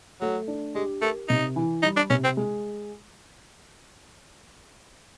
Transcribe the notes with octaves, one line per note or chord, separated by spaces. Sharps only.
F#3 A3
D4
G#3 G4
A3 A#4
C3 D#4
E3
G3 D#4
D4
C3 C#4
C4
G#3